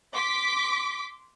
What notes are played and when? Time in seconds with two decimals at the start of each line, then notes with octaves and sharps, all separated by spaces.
0.15 C6 D6 B6